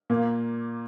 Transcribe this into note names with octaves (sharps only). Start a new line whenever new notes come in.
A#2 A#3